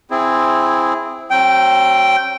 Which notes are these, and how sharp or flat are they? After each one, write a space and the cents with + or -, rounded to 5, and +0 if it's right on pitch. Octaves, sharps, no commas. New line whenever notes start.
C4 +0 E4 +5 G#4 -15
F#3 +25 C4 +35 G5 -10